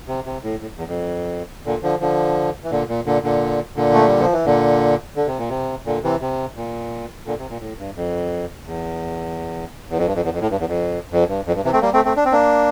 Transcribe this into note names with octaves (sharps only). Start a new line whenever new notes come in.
C3
C3
A2
A2
E2
F2
A#2 D3
D3 F3
D3 F3
E3
A#2 D3
A#2
A#2 D3
A#2 D3
A#2 D3
A3
G3
F3
E3
A#2 D3
D3
C3
A#2
C3
A#2 D3
C3 E3
C3
A#2
A#2 D3
C3
A#2
A2
G2
F2
E2
E2
F2
G2
F2
E2
F2
A2
G2
E2
F2
F2
G2
F2
G2
C3 E3
A3 C4
G3 A#3
A3 C4
A3 C4
D4
C4
A#3 D4